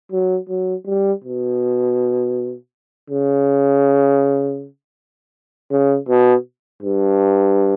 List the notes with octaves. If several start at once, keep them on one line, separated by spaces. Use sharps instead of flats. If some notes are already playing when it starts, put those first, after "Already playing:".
F#3
F#3
G3
B2
C#3
C#3
B2
G2